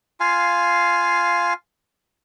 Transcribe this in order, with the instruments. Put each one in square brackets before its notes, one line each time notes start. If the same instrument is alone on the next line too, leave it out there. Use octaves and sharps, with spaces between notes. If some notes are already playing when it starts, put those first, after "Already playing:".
[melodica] F4 F5 G#5